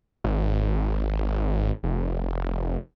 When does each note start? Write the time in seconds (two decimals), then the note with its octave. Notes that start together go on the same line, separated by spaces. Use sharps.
0.24 G#1
1.83 F1